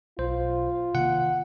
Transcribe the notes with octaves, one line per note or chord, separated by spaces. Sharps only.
B1 F4 C5
C3 D#3 A#3 F#5